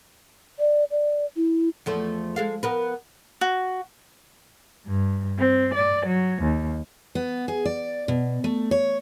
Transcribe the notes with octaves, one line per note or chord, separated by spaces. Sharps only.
D5
D5
E4
E2 F3 A3
G#3 A4 F5
B3 A#4 B4
F#4
G2
C4
D5
F#3
D#2
B3
G#4
D5
B2
A3
C#5